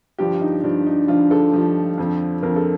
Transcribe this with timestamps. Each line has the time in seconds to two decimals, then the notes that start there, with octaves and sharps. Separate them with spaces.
0.18 G2 D3 F3 G4
0.41 D#4
0.63 G2 D3 F3 D4
0.86 D#4
1.08 G2 D3 F3 F4
1.31 A4
1.53 G2 D3 F3
1.98 F2 D3 F3
2.43 F2 D3 F3 A#4
2.56 A4